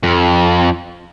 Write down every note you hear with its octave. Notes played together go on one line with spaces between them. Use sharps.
F2